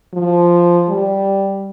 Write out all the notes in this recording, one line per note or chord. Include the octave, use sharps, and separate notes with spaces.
F3
G3